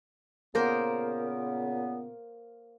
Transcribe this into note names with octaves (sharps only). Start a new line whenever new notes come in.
A#2 C#3 A#3 B3 A#4 C5